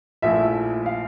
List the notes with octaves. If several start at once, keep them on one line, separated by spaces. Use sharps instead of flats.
A#1 A#2 F3 A3 E4 E5
F5